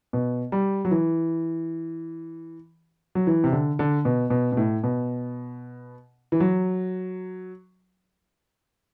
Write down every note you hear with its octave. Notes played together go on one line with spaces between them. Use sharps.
B2
G3
F#3
E3
F#3
E3
C3
D3
D3
B2
B2
B2
A2
B2
E3
F#3